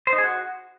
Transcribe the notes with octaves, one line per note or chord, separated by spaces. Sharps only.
C5
D#4
G#4
F#4